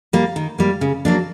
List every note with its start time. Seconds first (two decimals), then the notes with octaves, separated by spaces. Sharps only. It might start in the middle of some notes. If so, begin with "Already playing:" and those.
0.13 G3 A#3
0.36 D#3
0.58 G3 A#3
0.81 C#3
1.05 F#3 A#3 D4